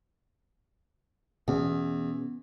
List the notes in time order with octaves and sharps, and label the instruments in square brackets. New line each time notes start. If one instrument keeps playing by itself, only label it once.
[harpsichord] E2 [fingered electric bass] B2 B3 C#4